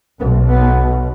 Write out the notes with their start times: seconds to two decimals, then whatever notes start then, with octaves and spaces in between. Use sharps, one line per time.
0.20 B1 B2 B3
0.48 B3